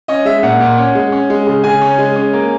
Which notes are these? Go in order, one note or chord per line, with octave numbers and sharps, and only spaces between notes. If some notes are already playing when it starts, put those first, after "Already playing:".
C#4 D#5
G#3 E5
A#2 F#5
A#2
C#4
G#3
C#4
G#3
C#3
C#3 G#5
C#4
G#3
C#4
A#3